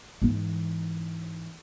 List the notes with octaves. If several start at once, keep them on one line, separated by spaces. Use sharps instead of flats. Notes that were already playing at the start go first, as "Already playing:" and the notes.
G#2 E3